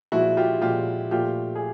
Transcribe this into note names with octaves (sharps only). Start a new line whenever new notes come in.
A#2 F3 G#3 E4 F#4
F4 G4
A#2 F3 G#3 F4 G4
A#2 F3 A3 F4 G4
G#4